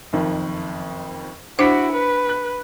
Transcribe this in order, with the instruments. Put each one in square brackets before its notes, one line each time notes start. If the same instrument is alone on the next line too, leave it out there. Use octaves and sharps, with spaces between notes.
[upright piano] F#1 F2 D#3
[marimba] D4 C5 [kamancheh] E4 F#4 [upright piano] B6 C#7 D7
[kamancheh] B4
[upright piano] F#6